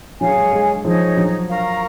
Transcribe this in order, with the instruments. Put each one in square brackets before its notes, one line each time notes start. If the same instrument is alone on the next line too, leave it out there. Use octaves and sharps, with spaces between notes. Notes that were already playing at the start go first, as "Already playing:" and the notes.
[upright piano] F#3 [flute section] G#4 C#5 F5 G#5
[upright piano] G#3
G#3
[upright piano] F3 [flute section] D#4 G#4 C#5
[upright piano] F#3
[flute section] A#4 F5 A#5 C#6